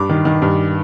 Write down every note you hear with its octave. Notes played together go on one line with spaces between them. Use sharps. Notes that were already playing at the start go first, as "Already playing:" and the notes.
Already playing: G2 D6
D#3
D#3
G2